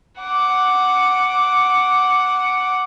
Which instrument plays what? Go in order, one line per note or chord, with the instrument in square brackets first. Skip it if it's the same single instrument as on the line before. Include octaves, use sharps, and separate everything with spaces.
[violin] F#5 D6